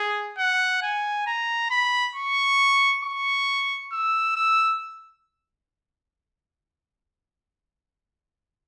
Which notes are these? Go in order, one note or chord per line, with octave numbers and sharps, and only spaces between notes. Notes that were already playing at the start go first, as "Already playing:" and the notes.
Already playing: G#4
F#5
G#5
A#5
B5
C#6
C#6
E6
E6